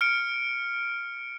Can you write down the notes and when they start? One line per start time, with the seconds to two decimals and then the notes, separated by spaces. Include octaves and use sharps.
0.01 F6 C#7 D7